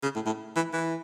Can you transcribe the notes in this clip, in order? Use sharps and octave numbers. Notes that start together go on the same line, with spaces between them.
C#3
A2
A2
E3
E3